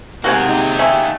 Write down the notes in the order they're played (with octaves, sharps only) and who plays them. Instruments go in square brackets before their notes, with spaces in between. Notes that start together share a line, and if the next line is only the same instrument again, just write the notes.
[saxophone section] G#2 C3 [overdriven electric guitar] G#3 A#3 [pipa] F#4 F#5 G#5
[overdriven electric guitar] D#4 G4
[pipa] A3 C#4 G#4